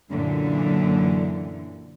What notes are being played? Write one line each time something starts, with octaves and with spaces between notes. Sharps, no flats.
F#2 A#2 D3 E3